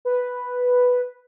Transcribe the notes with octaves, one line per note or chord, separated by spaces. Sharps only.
B4